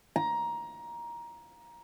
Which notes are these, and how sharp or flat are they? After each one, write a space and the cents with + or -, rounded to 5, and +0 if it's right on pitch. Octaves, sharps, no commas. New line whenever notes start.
A#5 +15